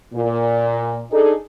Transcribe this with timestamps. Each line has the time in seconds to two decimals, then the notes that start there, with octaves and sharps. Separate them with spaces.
0.14 A#2
1.11 D4 D#4 G#4 A4